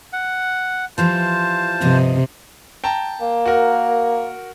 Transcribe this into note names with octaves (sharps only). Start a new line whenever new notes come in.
F#5
E3 F3 G3 F4 C5 A5
G2 C3 F3 D#5
G5 A5 A#5
A#3
F#4 A#4